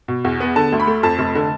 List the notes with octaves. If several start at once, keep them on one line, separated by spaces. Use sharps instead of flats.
B2
E2
B3
D3 A5
D2
B5
A3
F2 A5
F1
D3